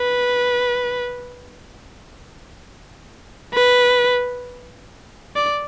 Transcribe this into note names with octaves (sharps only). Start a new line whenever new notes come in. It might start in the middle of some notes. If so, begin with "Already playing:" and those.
Already playing: B4
B4
D5